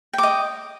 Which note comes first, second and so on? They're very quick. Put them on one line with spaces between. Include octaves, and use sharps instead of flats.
G5 D6 D#5